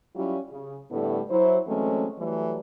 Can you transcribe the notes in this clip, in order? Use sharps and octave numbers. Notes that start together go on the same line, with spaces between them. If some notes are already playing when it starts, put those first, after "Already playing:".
F#3 G3 C#4 E4 F4 G4
C#3
A2 D3 G3 A3 B3 E4
F#3 E4 C5
E3 F#3 G#3 A3 C4 C#4
E3 F#3 G3 A3